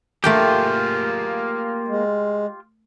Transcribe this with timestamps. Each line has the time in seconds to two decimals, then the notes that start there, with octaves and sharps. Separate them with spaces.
0.24 A3 A#3 F4 G4 G#4 A#4 G5
1.88 G#3